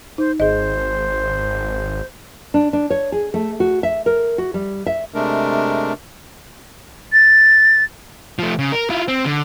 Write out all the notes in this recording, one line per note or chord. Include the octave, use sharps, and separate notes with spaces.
D#4 C5
G#1 G#4 C5 D#5
D4
D4
C#5
G#4
A3
F#4
E5
A#4
F#4
G3
E5
C3 G#3 A3 D4 A#4
A6
F3 A3
C#3
A#4
E4 F4
C4
D3